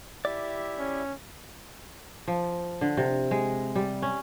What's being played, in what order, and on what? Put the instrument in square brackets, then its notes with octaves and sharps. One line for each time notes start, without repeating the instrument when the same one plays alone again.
[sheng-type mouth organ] E4 G4 E5 [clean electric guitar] D5
[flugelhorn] C#4
[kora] F3
D3
C3
G#3
G3
C#4